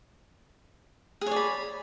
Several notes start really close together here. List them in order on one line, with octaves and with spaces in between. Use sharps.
G#4 C#5 D5 B5